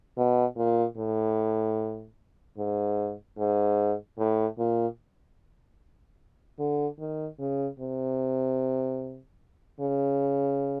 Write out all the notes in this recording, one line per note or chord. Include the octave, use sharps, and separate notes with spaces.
B2
A#2
A2
G#2
G#2
A2
A#2
D3
D#3
C#3
C3
C#3